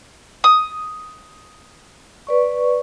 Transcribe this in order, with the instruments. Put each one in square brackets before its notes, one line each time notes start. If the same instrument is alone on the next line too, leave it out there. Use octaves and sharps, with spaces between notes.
[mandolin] D#6
[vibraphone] B4 D5 C#6